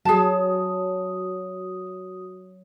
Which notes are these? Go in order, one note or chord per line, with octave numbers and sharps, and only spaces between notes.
F#3 F#4 G#4 A5 D#6